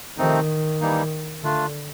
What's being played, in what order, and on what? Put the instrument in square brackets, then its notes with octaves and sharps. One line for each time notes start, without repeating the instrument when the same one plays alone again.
[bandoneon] C3 F3 A3 C4 D#4 [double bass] D#3
[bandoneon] E3 G3 A#3 D#4
[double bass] D3 [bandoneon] A3 D4 F4